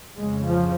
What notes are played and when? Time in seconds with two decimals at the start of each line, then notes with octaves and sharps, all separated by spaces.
0.17 F2 C#3 G#3
0.45 F3